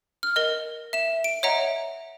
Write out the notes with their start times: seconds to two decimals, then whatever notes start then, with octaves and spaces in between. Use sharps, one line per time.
0.23 F6
0.36 A#4 D#5
0.93 E5 E7
1.24 D7
1.43 C#5 D#5 E5 F#5 A#5 D7